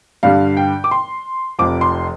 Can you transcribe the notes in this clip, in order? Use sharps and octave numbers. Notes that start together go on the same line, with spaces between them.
G2 D3 G3 F5
G5
D6
C6
F1 F2 F3 D6
C6